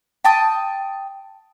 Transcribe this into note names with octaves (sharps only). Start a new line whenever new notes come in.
G5 A5 D#6